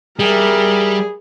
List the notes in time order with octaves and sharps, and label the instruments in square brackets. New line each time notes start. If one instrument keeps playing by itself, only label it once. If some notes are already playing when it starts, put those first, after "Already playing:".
[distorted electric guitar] G3 [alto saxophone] G#4 [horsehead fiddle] A#4 E5